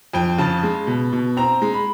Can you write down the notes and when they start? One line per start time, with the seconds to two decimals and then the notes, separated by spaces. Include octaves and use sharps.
0.13 F2 G5
0.38 C#3 A5
0.63 G#3
0.87 B2
1.13 B2
1.37 C4 A#5
1.62 G#3
1.74 B5